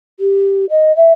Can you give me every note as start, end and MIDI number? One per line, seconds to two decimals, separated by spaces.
0.20 0.65 67
0.70 0.95 75
0.96 1.12 76